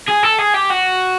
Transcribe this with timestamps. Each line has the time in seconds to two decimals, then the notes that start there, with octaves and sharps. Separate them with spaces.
0.09 G#4
0.24 A4
0.39 G#4
0.54 G4
0.70 F#4